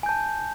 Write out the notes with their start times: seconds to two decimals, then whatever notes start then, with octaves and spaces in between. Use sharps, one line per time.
0.03 G#5
0.06 G6
0.09 A5